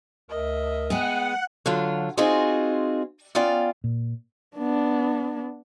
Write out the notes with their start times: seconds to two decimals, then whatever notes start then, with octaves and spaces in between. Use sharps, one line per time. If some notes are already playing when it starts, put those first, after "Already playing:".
0.30 D2 A#4 D#5 E5
0.90 G#3 B3 G#4 F#5 G5
1.66 D3 F#3 F4
2.17 C4 D#4 F4 F#4 G#4 C5
3.35 B3 C#4 F4 D5 F5 G5
3.84 A#2
4.57 B3 D4